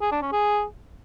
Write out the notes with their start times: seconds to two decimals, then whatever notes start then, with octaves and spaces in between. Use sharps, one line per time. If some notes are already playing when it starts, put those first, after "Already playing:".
0.01 G#4
0.12 D4
0.22 C#4
0.32 G#4